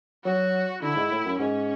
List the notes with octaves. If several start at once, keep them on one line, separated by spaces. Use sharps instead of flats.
F#3 F#4
D3 E4
G#2
A2
F#2
G#2 C#4